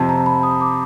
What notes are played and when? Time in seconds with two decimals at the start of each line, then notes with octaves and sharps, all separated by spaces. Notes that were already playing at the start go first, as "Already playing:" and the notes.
Already playing: F2 C3 F3 A5
0.09 A#5
0.26 B5
0.43 D#6
0.61 D6